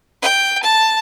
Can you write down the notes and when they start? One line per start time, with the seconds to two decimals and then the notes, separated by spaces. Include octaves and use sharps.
0.22 G5
0.63 A5